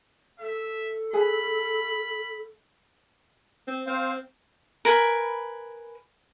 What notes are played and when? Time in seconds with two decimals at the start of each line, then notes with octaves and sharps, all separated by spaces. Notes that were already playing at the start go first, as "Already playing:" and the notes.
0.40 A4 E5
1.13 G#4 B4 G#5 B5
3.68 C4
3.87 C4 C5 F5
4.85 A#4 B4 G#5 B5